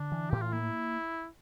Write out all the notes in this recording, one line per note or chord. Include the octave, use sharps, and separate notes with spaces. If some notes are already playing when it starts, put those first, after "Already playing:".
Already playing: D3 D4
E3
A2 G4
F4
A#3 E4